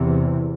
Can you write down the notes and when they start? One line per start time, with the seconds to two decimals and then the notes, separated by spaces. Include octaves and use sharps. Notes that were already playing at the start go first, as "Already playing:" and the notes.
Already playing: E2 C3 E3